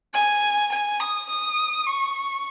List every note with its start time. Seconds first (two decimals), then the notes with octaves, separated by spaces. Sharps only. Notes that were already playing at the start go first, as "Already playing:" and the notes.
0.14 G#5
0.72 G#5
1.00 D#6
1.30 D#6
1.87 C#6